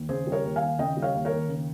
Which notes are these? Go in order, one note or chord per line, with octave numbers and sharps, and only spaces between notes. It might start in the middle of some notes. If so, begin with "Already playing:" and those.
Already playing: D#2
C#3 G#4 C5
G3
A#4 C#5
D#2
F5 G#5
D#2
C#3 D#5 G5
G3
C#5 F5
D#2
A#4 C#5
D#2
C#3